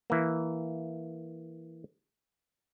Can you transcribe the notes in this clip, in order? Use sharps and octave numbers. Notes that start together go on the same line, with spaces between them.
E3 A#3